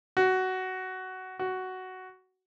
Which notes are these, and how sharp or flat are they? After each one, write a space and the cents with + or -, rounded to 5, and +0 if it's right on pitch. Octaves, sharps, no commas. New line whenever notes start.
F#4 +15
F#4 +10